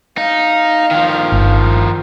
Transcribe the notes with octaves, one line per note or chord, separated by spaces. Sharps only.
D#4 F5
D#3 F3
G1